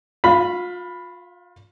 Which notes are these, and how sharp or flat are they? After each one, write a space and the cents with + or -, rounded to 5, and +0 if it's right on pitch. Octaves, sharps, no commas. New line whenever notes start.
F4 +35 F5 -20 B5 +0